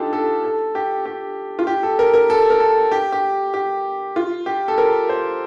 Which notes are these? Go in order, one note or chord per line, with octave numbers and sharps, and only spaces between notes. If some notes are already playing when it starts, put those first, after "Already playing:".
Already playing: D4 D#4 F4 G4 A4
A4
A4
G4
G4
F4
G4
A4
A#4
A#4
A4
A#4
A4
G4
G4
G4
F4
G4
A4
A#4
C5